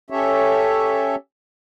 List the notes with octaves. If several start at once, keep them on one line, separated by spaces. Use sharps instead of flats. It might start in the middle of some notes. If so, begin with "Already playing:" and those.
C#4 G4 A4 C#5 E5